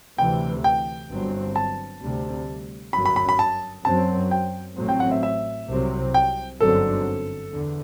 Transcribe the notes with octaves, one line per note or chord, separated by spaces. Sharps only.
D2 C3 E3 G5
G5
G1 G2 F#3 C4
A5
D2 C3 G3
G1 F#2 F#3 B5
B5
B5
B5
A5
F#2 F#3 C4 A5
G5
A1 A2 F#3 C4
G5
F#5
E5
E5
C2 C3 F#3 C4
G5
G1 F#2 D3 F#3 C4 A4
E2 D3